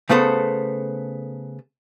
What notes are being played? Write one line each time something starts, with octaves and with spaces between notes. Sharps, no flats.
C#3 A3 B3 A4 C5